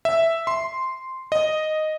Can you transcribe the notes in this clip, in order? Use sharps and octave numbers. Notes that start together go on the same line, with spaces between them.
E5
C6
D#5